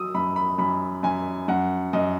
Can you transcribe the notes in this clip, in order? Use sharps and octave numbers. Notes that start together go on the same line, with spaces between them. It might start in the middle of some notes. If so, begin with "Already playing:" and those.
Already playing: F#3 D#6 E6
F#2 B5
B5
F#2 B5
F#2 G#5
F#2 F#5
F#2 D#5